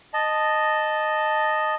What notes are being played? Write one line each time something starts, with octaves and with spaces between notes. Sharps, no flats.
D#5 A5